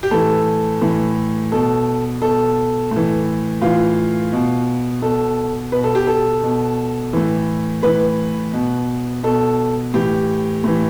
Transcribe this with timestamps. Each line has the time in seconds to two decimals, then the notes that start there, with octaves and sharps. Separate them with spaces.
0.03 G4
0.11 A2 E3 A4
0.81 A2 E3
1.52 B2 A4
2.22 B2 A4
2.91 A2 E3
3.62 A2 E3 F4
4.33 B2
5.02 B2 A4
5.72 B2 B4
5.84 A4
5.95 G4
6.07 A4
6.43 B2
7.13 A2 E3
7.83 A2 E3 B4
8.53 B2
9.23 B2 A4
9.94 A2 E3 G4
10.64 A2 E3